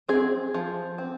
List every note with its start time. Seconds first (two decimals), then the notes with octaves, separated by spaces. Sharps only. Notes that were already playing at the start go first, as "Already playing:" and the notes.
0.08 C4 G#4
0.54 F3
0.98 C4